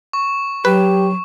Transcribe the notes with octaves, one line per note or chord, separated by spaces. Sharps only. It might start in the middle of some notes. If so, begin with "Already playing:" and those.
C#6
F#3 G4 B4